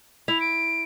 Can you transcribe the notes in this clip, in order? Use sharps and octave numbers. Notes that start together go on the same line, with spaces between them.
E4 F7
D7